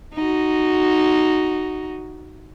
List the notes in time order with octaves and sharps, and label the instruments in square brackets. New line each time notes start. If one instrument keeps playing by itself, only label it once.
[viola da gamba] D#4 F#4